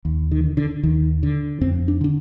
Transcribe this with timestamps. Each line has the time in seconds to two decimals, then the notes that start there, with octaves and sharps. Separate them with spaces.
0.05 D#2
0.31 D#3
0.44 D3
0.57 D3
0.83 D#2 D#3
1.23 D3
1.61 F2 C4
1.88 D4
2.01 D3 D4